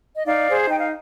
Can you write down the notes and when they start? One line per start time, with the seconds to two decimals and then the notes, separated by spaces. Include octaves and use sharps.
0.15 D#5
0.26 D#4 D5 F5
0.48 G#4 C5
0.68 D#4 G5
0.78 F5